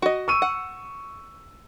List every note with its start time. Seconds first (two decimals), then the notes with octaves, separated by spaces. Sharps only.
0.02 F#4 D#5
0.28 C#6 E6 D#7
0.42 F#5